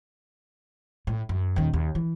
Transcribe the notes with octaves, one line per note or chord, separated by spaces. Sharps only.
A2
F#2
D#1 D#3
D#2
E3